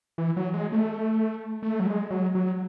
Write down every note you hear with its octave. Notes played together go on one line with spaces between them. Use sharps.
E3
F#3
G#3
A3
A3
F#3
G#3
F#3
F#3